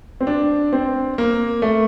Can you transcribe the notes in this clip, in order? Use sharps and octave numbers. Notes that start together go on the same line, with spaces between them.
C4
D4
C4
A#3
A3